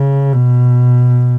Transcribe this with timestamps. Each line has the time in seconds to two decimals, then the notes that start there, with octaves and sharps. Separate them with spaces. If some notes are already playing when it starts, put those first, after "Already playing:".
Already playing: C#3
0.32 B2